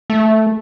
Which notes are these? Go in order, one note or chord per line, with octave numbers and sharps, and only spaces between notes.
A3